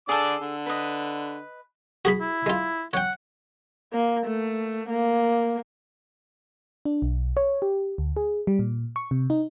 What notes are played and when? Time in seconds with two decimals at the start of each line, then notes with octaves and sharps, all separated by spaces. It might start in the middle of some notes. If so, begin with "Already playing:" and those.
0.09 D3 G#4 A4 D5 D6
0.42 D3
0.66 B4 D#5
2.05 F#4 G#4 B5
2.21 E4
2.46 G#3 F4
2.93 C#5 F#5 G5
3.93 A#3
4.26 A3
4.89 A#3
6.85 D4
7.02 B1
7.37 C#5
7.62 G4
7.98 D2
8.17 G#4
8.47 G3
8.59 A#2
8.96 C#6
9.11 C3
9.30 D#4